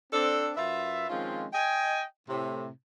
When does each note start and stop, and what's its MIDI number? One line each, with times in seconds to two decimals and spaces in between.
0.13 0.51 60
0.13 0.51 62
0.13 0.51 69
0.57 1.09 42
0.57 1.09 65
0.57 1.09 71
0.57 1.09 76
1.10 1.47 51
1.10 1.47 53
1.10 1.47 56
1.10 1.47 60
1.10 1.47 61
1.10 1.47 65
1.53 2.04 75
1.53 2.04 79
1.53 2.04 80
2.29 2.69 45
2.29 2.69 48